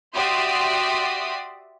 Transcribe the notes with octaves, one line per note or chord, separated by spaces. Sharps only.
F#4 G4 D5 E5 C6 D#6